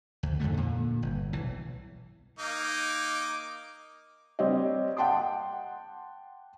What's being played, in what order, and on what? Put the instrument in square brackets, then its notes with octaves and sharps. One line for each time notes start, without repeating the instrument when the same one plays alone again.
[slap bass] D2
F2 G#2 D3 A3
A#2 D3
G1
B1 E3
[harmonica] A#3 D#4 D6
[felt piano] G3 C4 G4 C#5 D#5
F#5 G5 A5 C6 D6